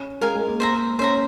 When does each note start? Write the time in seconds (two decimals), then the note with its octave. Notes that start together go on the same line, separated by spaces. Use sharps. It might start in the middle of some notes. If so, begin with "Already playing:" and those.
Already playing: C#4
0.21 G#3 A#4 F5 G#5
0.35 G#3
0.48 A#3
0.60 C5 E5 A#5
0.99 C#4 C5 E5 A#5